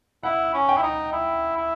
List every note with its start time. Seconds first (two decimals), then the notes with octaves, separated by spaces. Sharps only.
0.23 E4 F#5
0.54 C#4
0.69 G5
0.77 E4
0.82 D#4
1.13 E4
1.56 E4